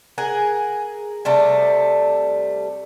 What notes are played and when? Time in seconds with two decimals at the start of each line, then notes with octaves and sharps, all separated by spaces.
0.18 G#4 A#4 F#5
1.25 C3 G3 A3